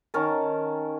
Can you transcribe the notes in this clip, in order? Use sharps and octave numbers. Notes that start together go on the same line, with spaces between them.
D#3 C#4 A#4 A5